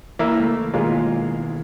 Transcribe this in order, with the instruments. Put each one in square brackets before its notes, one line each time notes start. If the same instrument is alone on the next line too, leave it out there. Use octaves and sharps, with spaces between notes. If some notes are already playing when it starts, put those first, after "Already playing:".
[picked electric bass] E3 [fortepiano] A#3 E4 E5
[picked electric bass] C#2 [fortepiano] A3
[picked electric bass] B2 D#3 E3 [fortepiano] G#3 A#3 F4